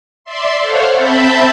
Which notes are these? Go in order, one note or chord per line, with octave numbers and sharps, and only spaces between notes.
D5 E5 C6
A4 C5 C#5 F5 F#5
C4 E5 A5 B5 G6